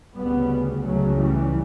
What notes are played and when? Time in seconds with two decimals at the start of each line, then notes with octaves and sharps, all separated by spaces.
0.16 D2 C#3 G3 B3
0.83 C#2 C#3 F#3 A3
1.17 E3 G3